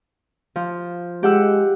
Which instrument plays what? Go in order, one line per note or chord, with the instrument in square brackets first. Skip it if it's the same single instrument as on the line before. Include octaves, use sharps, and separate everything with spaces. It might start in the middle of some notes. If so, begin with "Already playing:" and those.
[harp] F3
[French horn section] G#3 [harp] G4 F#5 E6